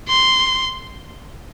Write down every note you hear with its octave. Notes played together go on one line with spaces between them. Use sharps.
C6